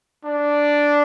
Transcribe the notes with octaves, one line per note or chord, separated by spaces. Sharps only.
D4